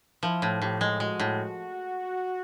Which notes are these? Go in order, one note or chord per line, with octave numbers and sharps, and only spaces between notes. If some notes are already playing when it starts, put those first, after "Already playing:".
F3 E4
A2
A2 G4
G#3
G#3 F#4
A2